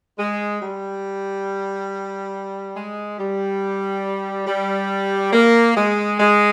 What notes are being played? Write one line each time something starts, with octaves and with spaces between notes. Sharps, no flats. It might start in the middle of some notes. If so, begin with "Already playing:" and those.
G#3
G3
G#3
G3
G3
A#3
G#3
G#3